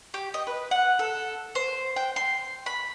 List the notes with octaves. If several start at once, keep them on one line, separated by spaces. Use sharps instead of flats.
G4
D#5
B4
F#5
A4
C5
G5
C6
B5